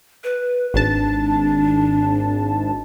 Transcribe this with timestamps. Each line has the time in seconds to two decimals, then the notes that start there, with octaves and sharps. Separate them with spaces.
0.24 B4
0.74 G#1 D4 A5